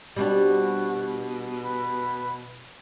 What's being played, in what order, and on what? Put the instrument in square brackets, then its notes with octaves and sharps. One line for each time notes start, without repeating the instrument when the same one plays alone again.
[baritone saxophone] B2 [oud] G3 C4 D4 [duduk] F#4
[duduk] B4